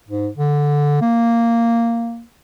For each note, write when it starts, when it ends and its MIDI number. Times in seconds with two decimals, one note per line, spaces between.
0.08 0.28 44
0.36 0.97 50
1.01 2.23 58